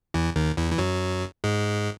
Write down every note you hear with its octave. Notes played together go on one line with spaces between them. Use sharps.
E2 E3
D#2 D#3
E2 E3
E3
F#2 F#3
G#2 G#3